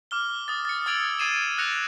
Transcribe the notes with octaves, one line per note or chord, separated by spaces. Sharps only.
D6 F6 G7
D#6 A6
A6 C#7
D#6 E6 G#6 D7 F7 F#7
D#6 G#6 C7 D#7 E7
F#6 A#6 C#7 F7